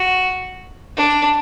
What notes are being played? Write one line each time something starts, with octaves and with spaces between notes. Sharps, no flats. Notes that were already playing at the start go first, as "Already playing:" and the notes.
Already playing: F#4
D4